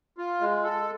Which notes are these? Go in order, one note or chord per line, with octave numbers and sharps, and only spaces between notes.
F4
G#3
A4